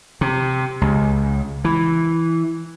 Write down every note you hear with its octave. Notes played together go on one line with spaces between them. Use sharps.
C3
C#2
E3